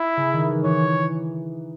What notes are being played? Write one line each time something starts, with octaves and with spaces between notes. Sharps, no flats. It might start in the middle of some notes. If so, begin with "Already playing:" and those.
Already playing: E4
C#3
D#3
E3
E3 C#5